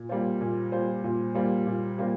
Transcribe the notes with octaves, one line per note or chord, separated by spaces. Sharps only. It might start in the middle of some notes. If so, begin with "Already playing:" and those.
Already playing: A#2
G3 A#3 F4 C5
A#2
G3 A#3 F4 C5
A#2
G3 A#3 F4 C5
A#2
G3 A#3 F4 C5